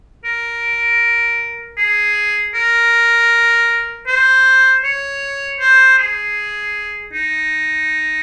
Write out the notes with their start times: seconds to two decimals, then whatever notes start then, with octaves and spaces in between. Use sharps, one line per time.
0.25 A#4
1.78 G#4
2.54 A#4
4.07 C5
4.84 C#5
5.60 C5
5.98 G#4
7.13 D#4